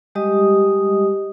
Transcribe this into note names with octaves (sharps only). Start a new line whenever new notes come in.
G3 G#3 G4 D#5 D#6